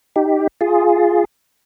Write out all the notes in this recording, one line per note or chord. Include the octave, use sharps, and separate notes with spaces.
D#4 G4
F4 G#4